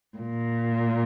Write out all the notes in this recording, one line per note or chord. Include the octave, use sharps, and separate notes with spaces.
A#2